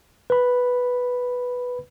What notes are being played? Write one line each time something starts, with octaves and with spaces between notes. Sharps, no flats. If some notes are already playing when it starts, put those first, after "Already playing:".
B4 B5